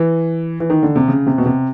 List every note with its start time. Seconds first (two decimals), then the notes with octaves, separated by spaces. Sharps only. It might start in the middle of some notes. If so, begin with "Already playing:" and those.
Already playing: E3
0.60 E3
0.70 D#3
0.83 D3
0.96 C3
1.08 C#3
1.26 C3
1.38 B2
1.46 C3